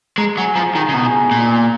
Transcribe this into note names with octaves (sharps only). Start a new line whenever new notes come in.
G#3 A#5
F#3 G#5
F3 A#5
D#3 A#5
C#3
B2 A#5
G#5
A#5
A#2